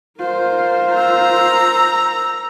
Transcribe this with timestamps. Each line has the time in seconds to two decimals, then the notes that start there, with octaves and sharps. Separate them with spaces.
0.20 F4 A#4 C5
0.95 A#5 E6